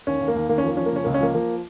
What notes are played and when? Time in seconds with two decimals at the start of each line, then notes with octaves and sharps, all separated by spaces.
0.07 D#2 C#4
0.20 D#2
0.28 A#3
0.36 D#2
0.49 D#2 A#3
0.58 C#4
0.64 F3 A#3
0.77 F3 C#4
0.86 A#3
0.92 C#3 C#4
1.04 C#2 A#3
1.14 C#4
1.20 F3 A#3
1.34 F3 A#3